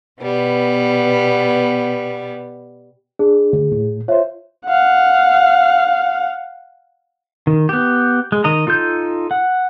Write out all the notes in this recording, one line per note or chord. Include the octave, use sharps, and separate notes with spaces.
B2 G3 B3
D4 G#4
D2
A2
F4 C5 C#5 E5
F5 F#5
D#3
B3 G4
G#3
D#3 D#5 A#5
D#4 F4 A4 G6
F#5